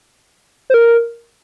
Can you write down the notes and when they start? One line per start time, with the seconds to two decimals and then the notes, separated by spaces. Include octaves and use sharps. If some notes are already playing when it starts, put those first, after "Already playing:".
0.70 C5
0.74 A#4